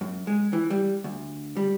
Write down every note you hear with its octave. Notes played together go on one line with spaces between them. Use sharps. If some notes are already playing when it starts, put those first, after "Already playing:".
F#2
G#3
E3
G3
D2
G3